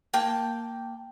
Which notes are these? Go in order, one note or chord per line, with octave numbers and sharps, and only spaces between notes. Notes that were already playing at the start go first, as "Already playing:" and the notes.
A#3 G5 A5